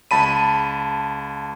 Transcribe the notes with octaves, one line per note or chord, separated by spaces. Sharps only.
C#2 A5 B5 D#7